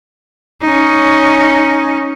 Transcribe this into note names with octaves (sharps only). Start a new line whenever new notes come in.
C#4 D#4